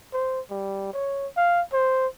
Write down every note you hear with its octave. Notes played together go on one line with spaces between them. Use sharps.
C5
G3
C#5
F5
C5